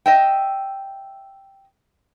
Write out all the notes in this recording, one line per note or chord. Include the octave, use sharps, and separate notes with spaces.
D#5 E5 G5